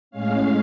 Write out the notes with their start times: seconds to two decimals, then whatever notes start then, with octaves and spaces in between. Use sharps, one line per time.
0.11 A2 G#3 C#4 F5